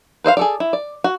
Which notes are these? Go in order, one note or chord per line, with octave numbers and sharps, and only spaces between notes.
B4 C5 D#5 F5
G#4 A4 D5
E4
D5
F#4